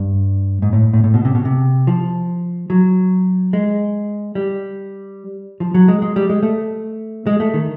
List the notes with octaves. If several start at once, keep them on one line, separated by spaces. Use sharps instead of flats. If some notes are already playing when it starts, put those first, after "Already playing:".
Already playing: G2
G#2
A2
A2
A2
B2
C3
B2
C3
F3
F#3
G#3
G3
F3
F#3
G#3
G#3
G3
G#3
A3
G#3
A3
D#3